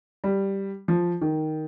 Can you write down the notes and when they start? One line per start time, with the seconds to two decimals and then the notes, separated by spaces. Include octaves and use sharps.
0.24 G3
0.88 F3
1.21 D#3